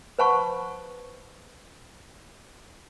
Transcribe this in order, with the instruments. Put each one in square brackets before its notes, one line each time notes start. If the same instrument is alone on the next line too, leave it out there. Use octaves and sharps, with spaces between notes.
[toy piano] B4 C5 F#5 A5 B5 C#6